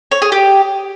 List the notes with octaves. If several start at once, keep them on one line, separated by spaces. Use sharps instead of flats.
C#5
G#4
G4